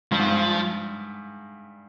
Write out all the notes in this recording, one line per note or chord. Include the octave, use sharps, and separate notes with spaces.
G2 F3
G#2
G2